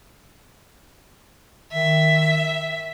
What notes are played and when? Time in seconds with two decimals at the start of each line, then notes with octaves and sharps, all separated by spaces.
1.72 D#3 E5